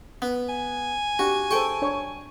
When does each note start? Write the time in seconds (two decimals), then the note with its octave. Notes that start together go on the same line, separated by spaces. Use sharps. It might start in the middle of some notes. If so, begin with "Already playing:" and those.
0.22 B3
0.49 G#5
1.19 D4 F#4 G4
1.51 G#4 A4 C5 G5 C#6
1.82 D4 C#5